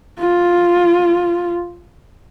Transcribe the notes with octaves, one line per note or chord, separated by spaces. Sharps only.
F4